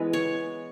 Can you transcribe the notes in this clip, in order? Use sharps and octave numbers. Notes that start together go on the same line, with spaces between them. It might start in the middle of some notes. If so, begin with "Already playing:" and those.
Already playing: E3 G#3 B3 B4
C#5